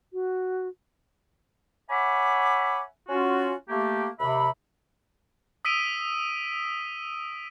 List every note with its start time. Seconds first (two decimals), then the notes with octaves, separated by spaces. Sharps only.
0.13 F#4
1.89 C#5 E5 F#5 G#5 B5 D6
3.08 C#4 F4 F#4
3.69 A3 A#3 G4
4.20 D#2 C3 G4 E5 B5
5.65 D#6 E6 B6 D7 D#7 G7